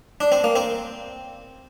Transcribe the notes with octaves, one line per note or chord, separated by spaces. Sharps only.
D4
C4
A#3
C4